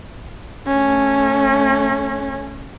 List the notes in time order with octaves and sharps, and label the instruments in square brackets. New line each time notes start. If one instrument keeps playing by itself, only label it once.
[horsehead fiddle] A3 C#4